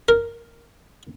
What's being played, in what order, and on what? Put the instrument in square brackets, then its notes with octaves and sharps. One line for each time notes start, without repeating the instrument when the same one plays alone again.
[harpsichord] A#4